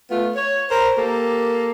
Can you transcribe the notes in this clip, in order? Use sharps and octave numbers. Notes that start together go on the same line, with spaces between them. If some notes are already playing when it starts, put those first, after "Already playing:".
A3 B3 F4
C#5
A#4 C5
A#3 G4 A4